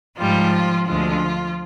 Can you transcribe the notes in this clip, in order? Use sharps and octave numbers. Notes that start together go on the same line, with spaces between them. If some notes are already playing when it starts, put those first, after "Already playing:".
G#2 F3 G3 F4
D2 D3 F3 G#3 F4